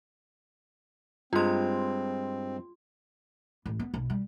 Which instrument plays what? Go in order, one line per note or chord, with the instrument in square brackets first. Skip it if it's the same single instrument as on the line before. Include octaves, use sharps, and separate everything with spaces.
[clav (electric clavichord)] G2 G#3 [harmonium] C4 [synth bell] F4 C6
[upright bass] A1
B3
B1
G3